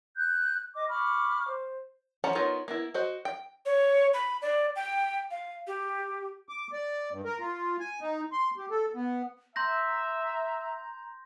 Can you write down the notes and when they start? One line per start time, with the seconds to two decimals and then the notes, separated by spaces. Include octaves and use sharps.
0.17 F#6 G6
0.75 D#5 D6
0.89 B5 C#6 D6 F6
1.48 C5
2.24 F3 C#4 F#5 A5 A#5
2.35 B3 D#4 F4 A#4 C#5
2.68 A#3 B3 E4
2.94 F#4 C5 D#5
3.25 G5
3.66 C#5
4.14 B5
4.42 D5
4.76 G5
5.31 F5
5.67 G4
6.49 D6
6.73 D5
7.12 G2
7.25 A#4
7.40 F4
7.80 G#5
8.01 D#4
8.32 C6
8.58 G4
8.71 A4
8.95 B3
9.56 E5 A#5 C6 G6 A#6